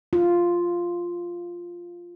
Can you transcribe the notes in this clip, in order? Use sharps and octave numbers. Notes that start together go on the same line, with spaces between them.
F4